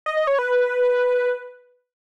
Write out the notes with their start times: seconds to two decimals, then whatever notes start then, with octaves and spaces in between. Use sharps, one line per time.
0.06 D#5
0.17 D#5
0.27 C#5
0.39 B4